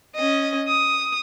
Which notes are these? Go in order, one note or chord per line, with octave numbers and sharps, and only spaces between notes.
C#4 D#5
D#6